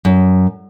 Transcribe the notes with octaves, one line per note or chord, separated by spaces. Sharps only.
F#2